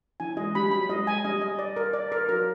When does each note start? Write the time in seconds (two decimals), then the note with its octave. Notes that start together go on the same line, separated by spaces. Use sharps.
0.20 E3 G#5
0.37 G#3 D#5
0.55 G3 B5
0.71 F#3 B5
0.89 G#3 D#5
1.07 G#5
1.24 G3 D#5
1.41 D#5
1.59 D5
1.76 A#4
1.94 D5
2.12 A#4
2.29 F#3 A#4